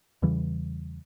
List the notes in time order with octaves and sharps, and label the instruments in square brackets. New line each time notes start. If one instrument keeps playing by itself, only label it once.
[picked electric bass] E2 C#3 E3 G3